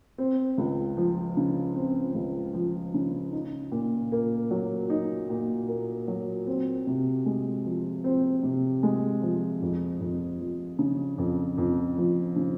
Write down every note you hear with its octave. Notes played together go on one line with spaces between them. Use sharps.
C4
C#2
F3
C#3
C4
C#2
F3
C#3
D#4
A#2
A#3
F#3
D#4
A#2
A#3
F#3
C4
C3
G#3
F3
C4
C3
G#3
F3
F2
F2
F3
C#3
F2
F2
F3
C#3